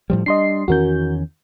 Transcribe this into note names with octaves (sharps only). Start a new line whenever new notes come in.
A2 F3 G3
G3 D4 D#5 C6 C7
E2 D#3 C#4 F#4 A#4 G6